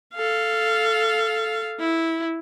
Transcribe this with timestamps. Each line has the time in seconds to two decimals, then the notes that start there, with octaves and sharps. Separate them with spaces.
0.14 A4 F5
1.79 E4